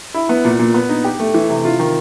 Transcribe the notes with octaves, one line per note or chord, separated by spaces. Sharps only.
E4
B3
A#2
A#2
B3
D#4
G4
A3
E3
C3
F4
D#3